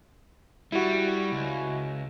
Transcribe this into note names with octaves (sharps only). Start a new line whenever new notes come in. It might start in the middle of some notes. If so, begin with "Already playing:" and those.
G3 E4 F#4
C#2